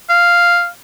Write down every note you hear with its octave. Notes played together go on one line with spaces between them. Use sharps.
F5